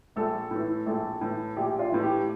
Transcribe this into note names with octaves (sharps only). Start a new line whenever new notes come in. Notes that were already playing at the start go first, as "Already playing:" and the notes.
A#1 A3 A4
A2 E3
A#1 A3 A4
A2 E3
A#1 G4
F4
A2 E3
G4